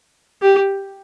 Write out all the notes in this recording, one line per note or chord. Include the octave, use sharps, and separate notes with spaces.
G4